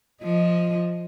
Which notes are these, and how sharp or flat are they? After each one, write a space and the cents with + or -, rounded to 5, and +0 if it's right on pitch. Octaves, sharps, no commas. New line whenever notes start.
F3 +0 D#5 +0